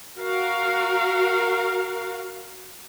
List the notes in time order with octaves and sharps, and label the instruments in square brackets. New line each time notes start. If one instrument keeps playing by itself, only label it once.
[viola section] F#4 A#4 F5